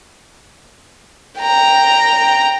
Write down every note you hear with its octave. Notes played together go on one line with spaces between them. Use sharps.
G5 A#5